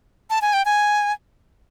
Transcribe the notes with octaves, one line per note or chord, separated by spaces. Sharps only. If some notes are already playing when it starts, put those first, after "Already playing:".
A5
G#5
G5
G#5